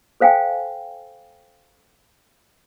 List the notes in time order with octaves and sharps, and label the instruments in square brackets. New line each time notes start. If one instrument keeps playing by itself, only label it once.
[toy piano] A4 C5 F5 G5 G#5